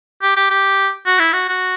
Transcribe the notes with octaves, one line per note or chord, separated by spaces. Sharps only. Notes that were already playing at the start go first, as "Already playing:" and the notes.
G4
G4
G4
F#4
E4
F#4
F#4